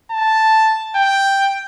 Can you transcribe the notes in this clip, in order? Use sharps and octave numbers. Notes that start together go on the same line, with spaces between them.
A5
G5